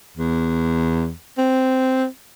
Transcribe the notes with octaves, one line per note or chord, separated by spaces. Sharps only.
E2
C4